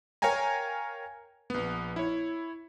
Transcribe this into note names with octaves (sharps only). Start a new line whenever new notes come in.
A#4 C#5 F5 G5 G#5 A#5
A#1 B3
E4 C#5